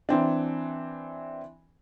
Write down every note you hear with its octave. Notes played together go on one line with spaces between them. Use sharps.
E3 C4 D4